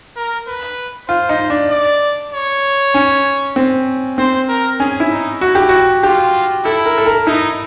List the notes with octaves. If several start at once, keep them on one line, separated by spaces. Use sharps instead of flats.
A#4
B4
F4 C5
D#4
D4
D5
C#5
C#4
C4
C4 C5
A#4
C#4 G#4
E4
D#4
E4 F#4
G4
F#4
F4 G4
E4 A4
A#4
A4
A#4
D#4 E4